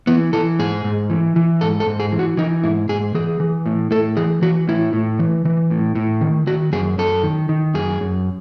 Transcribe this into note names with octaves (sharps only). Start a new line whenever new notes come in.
E3 B3
E3 A4
G#2 G#4
G#2
E3
E3
G#2 A4
A4
G#2
G#4
E3
F#4
E3 D#4
G#2 E4
G#2 G#4
E3 G#4
E3
A2
A2 A4
E3 G#4
E3 F#4
A2 E4
A2
E3
E3
A2
A2
D#3
D#3 F#4
F#2 G#4
F#2 A4
D#3
D#3
F#2 G#4
F#2